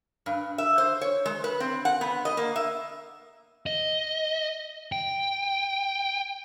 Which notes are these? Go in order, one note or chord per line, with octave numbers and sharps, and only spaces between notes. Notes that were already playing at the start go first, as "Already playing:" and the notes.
G2
E5
C5
C#5
G#3
B4
C4
F#5
B3
D#5
A#3
E5
D#5
G5